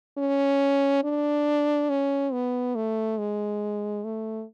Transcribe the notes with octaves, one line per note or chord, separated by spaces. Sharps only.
C#4
D4
C#4
B3
A3
G#3
A3